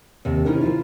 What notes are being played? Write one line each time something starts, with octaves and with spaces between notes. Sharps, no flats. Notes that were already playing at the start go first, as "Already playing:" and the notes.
D#2 C3 E5
C3 C#4 D#4 E4 A#4
F3 E4 F4